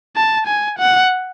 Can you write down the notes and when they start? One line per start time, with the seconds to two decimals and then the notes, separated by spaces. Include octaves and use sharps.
0.16 A5
0.47 G#5
0.78 F#5